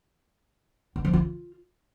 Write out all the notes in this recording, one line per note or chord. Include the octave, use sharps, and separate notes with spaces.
B3
F3
F4